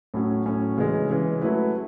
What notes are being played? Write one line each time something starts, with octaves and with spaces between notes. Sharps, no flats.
A2 F#3 C#4
A2 F#3 C#4
C#3 E3 G#3
C#3 E3 G#3
F#3 A3 E4 B4